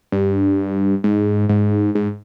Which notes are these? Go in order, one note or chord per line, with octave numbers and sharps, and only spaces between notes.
G2
G#2
G#2
G#2